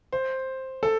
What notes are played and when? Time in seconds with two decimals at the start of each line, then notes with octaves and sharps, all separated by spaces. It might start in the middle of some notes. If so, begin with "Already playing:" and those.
0.12 C5
0.83 A4